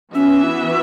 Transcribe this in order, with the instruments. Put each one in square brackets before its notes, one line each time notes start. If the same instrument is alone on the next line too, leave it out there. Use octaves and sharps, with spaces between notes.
[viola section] E3 B3 F#4 B4 E5 [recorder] C#4
[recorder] E4